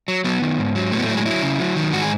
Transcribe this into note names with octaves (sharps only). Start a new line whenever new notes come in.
F#3
F#3 B3
D#3
G#2
F#3
A2 A3
B3
A3
F#3
G#3
F#3 E4
C#3
F#3
D#3
G#2 F#4
G#4